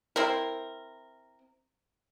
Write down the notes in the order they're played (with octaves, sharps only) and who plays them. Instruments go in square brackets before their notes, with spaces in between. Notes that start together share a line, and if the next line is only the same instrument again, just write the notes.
[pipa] C4 E4 A#4